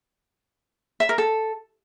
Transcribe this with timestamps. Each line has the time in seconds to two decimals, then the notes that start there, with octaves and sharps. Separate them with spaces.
1.00 E5
1.09 A#4
1.18 A4